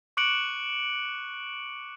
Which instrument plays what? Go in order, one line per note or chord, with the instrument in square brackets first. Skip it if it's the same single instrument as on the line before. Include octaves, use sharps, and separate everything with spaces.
[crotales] C#6 D6 F#6 C#7 D7 F#7